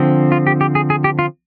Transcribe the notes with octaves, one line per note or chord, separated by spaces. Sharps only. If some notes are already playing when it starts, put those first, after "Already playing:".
Already playing: D3 F3 C4
F4
G4
G4
G#4
G#4
G4
F4